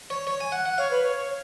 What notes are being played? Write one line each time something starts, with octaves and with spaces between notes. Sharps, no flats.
C#5
C#5
G#5
F#5
F#5
C#5 F5
B4
C#5
C#5